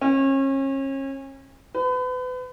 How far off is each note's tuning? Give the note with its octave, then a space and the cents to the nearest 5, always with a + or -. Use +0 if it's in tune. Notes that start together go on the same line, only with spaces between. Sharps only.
C#4 -35
B4 +35